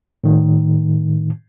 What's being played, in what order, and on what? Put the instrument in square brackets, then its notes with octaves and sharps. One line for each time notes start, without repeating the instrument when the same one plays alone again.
[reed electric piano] A2 D#3